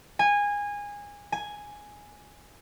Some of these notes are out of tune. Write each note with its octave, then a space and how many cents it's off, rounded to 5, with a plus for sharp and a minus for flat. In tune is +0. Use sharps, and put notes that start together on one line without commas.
G#5 -20
G#5 +0